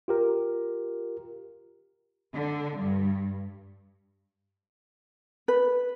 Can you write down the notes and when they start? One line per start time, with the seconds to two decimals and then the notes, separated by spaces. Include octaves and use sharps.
0.08 F4 G4 A#4
2.34 D3
2.78 G2
5.48 B4